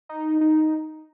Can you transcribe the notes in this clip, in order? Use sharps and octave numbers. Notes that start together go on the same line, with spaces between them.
D#4
D#4